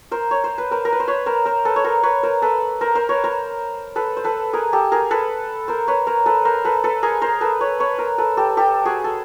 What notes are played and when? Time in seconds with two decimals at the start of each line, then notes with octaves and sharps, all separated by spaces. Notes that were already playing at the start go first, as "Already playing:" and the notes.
0.11 A#4 C5
0.31 C#5
0.44 C5
0.58 B4
0.71 A#4 C5
0.85 A#4
0.93 B4
1.00 C5
1.08 B4 C#5
1.26 A#4 C5
1.45 A#4 C5
1.65 A4 B4
1.76 C#5
1.84 A#4 C5
2.03 B4 C#5
2.23 A#4 C5
2.42 A4 B4
2.81 A#4 C5
2.95 A#4 C5
3.09 B4 C#5
3.24 A#4 C5
3.96 A4 B4
4.17 C5
4.24 A4 B4
4.53 G#4 A#4
4.73 G4 A4
4.92 G#4 A#4
5.11 A4 B4
5.68 A#4 C5
5.88 B4 C#5
6.07 A#4 C5
6.26 A4 B4
6.45 A#4 C5
6.65 A4 B4
6.84 A4 B4
7.03 G#4 A#4
7.22 A#4 C5
7.41 A4 B4
7.61 B4 C#5
7.80 B4 C#5
7.98 A#4 C5
8.18 A4 B4
8.37 G4 A4
8.57 G4 A4
8.85 F#4 G#4
9.04 A4